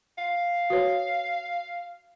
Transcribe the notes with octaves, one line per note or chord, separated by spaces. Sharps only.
F5
F#4 B4 C#5